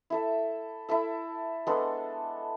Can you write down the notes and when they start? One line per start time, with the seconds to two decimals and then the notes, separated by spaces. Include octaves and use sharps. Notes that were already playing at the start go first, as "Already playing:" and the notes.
0.10 E4 A4 E5
0.89 E4 A4 E5
1.67 G#3 B3 D4 A4